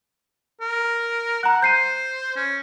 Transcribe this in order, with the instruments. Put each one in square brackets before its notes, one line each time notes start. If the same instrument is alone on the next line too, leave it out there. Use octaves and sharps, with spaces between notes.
[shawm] A#4
[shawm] F#5 [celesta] A#5 F#6
[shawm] C5 [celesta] G6 C7 D#7
[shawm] C#4